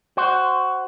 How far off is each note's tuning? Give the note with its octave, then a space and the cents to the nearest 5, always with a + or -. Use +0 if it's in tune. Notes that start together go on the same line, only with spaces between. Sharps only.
F#4 +10 C5 +0